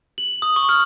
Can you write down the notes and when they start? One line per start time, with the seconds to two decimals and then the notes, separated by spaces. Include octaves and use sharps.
0.18 F#7
0.42 D#6
0.56 C#6
0.69 F6